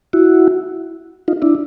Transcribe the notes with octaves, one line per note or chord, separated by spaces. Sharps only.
E4 F#4
D#4 F4
D4 E4